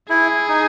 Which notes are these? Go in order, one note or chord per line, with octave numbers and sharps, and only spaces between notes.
E4 G#4
D#4